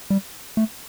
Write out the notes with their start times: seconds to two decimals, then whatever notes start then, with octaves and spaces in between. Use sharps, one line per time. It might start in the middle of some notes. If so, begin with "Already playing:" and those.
0.10 G3
0.57 A3